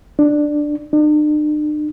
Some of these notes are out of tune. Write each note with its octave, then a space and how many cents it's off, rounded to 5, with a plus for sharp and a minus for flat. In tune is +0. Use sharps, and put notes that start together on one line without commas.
D4 +10
D4 +45